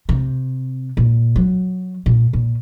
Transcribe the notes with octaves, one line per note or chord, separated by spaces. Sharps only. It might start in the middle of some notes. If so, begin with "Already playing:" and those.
C3
A#2
F#3
A#2
A#2